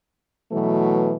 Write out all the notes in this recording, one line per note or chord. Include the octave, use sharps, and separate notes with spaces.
B2 E3 F#3 A3